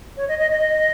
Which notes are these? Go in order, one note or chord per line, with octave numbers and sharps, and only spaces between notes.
C#5
D#5
D#5
D#5